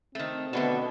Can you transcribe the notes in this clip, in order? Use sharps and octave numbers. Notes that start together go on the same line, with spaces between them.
D#3 A3 C4
B2 D3 D#3 A3